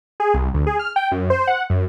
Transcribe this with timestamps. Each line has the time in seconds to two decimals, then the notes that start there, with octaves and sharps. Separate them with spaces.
0.20 G#4
0.34 C2
0.54 D2
0.67 G#4
0.79 F6
0.96 G5
1.11 F#2
1.30 C5
1.47 F#5
1.70 F#2